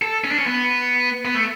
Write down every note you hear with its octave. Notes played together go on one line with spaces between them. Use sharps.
A4
C#4
D4
C#4
B3
B3
A3